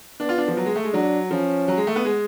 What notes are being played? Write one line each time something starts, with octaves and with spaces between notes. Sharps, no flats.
B3 D4
F4
D4
F3
F#3
G#3
A3
G#3
F#3 D4
F3 C#4
F#3
G#3
A3
B3
G#3